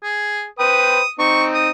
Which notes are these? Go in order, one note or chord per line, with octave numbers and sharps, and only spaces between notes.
G#4
B4 C5 G5 D#6
C4 D#4 C#6
D#6